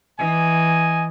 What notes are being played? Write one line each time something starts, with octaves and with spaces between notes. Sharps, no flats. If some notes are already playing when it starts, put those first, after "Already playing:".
E3 D#5 G#5